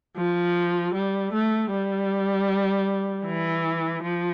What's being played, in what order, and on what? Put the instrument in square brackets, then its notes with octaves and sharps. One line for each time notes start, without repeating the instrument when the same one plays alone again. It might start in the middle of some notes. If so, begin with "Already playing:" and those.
[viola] F3
G3
A3
G3
E3
F3